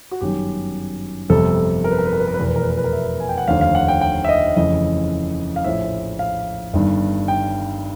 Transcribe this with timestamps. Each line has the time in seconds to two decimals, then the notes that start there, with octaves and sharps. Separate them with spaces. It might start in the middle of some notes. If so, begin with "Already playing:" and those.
0.11 F#4
0.21 G1 F#2 D#3 G4
1.29 G1 F2 C3 A4
1.84 A#4
1.91 B4
1.98 A#4
2.06 B4
2.13 A#4
2.20 B4
2.27 A#4
2.34 B4
2.39 F1 E2 B2 A#4
2.48 B4
2.56 A#4
2.62 B4
2.70 A#4
2.77 B4
2.84 A#4
2.93 E5
3.20 G#5
3.29 G5
3.38 F#5
3.47 F1 D#2 D3 F3 F5
3.61 F5
3.75 F#5
3.88 G5
4.01 G5
4.25 E5
4.29 D#5
4.56 F1 F2 C#3 E3 D#5
5.56 F5
5.64 A#1 A2 F3 E5
6.19 F5
6.73 G1 G2 D#3
7.28 G5